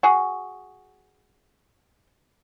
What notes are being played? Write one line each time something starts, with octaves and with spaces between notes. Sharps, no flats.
F#4 G#4